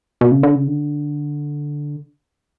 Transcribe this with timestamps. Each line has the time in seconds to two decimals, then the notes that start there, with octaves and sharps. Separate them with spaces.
0.21 B2
0.32 C#3
0.43 D3
0.55 C#3
0.68 D3